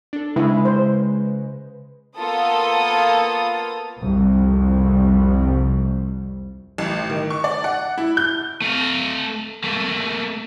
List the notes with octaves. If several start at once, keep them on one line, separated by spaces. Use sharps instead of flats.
D4 A4
C#3 G#3 E4 B4 E5
C5
A#3 B3 F4 A4 D#6
C2 F2 C3 G3
A1
D#3
C#6
D5
F#5
E4
G6
A3 F5
A3 A#3